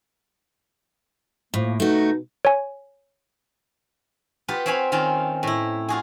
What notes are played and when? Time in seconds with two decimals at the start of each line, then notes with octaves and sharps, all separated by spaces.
1.54 A2 F3 A#3
1.80 B2 A3 D#4 F#4
2.45 C#5 G#5
4.48 B3 F4 G4 B4
4.66 C4 C#5 F5 G#5 B5
4.92 D#3 C4 C#4 F4
5.43 A2 E4
5.89 F4 F#4 G#4